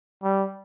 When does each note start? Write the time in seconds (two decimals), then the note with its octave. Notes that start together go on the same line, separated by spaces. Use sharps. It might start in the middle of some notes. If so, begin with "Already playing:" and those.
0.23 G3